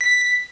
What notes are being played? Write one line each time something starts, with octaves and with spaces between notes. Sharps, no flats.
B6